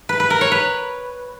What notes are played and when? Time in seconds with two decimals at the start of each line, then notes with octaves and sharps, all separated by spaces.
0.09 B4
0.20 B4
0.30 A#4
0.41 C#5
0.52 B4